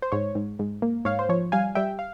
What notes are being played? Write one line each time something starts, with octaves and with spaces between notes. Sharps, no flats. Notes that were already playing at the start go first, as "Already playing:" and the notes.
C5
G#2 C#5
G#2
G#2
A#3
G#2 C#5 F5
C5
F3 C#5
G3 F5 G#5
G3 E5 G5
F5